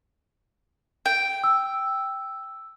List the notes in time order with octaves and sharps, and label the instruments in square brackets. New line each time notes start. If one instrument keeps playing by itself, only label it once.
[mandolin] G5
[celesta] E6